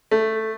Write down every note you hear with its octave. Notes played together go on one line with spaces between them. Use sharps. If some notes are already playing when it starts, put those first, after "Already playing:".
A3